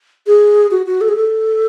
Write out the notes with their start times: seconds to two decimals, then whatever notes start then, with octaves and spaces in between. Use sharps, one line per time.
0.27 G#4
0.71 F#4
0.86 F#4
1.01 A4
1.09 G#4
1.16 A4